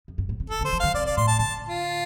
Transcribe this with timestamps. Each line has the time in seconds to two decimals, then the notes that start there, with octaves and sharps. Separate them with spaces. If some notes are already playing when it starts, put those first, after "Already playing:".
0.08 F2
0.18 G2
0.29 A2
0.40 C3
0.50 D3 A4
0.61 D3 C5
0.73 F3
0.80 D3 F5
0.94 C3 D5
1.05 D5
1.17 A2 C6
1.27 A5
1.39 D3 A5
1.68 F4